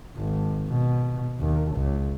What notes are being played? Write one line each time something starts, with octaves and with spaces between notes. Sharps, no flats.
G#1
B2
D#2
C#2